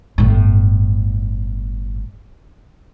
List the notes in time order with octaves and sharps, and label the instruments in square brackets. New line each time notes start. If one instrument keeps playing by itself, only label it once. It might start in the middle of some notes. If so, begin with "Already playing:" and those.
[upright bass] G1 A2